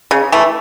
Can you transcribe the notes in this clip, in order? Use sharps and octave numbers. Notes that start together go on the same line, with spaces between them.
C#3
E3 A3